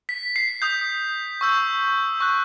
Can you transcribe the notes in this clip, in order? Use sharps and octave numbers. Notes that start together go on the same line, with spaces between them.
B6
C7
D#6 G6
C#6 E6 G6
C#6 F#6